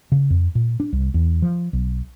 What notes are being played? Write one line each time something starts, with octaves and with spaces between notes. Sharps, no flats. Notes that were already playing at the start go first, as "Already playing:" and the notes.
C#3
F2
A#2
D4
C2
E2
F3
B1